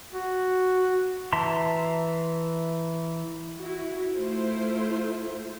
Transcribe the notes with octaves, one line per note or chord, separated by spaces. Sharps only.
F#4
E3 E5 A5 A#5 C6
E4 F#4
A3 E4 F4 C5